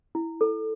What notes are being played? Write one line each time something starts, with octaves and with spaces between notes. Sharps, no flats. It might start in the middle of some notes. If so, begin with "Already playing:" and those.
E4
A4